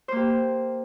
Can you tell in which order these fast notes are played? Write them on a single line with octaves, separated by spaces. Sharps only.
C5 A#3 G4